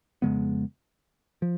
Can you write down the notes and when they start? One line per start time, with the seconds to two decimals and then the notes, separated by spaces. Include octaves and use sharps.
0.22 F2 C#3 G#3 B3
1.42 F3